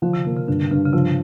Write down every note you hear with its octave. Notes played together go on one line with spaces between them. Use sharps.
D3 F3
C3
C3 A#3
C#3
G2 D3
G2 C#3
C#3
C3 F3